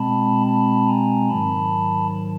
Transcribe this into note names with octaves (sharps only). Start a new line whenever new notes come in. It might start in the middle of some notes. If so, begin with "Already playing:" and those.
Already playing: B2 G#3 C4 A5 B5
A5 B5
G#5 A#5
G#2 D#3 F#3 A5 B5